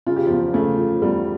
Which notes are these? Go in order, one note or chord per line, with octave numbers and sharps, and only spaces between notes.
C#3 F4
G4
F3 F4
E2
C#3 A3
F3
E2 G3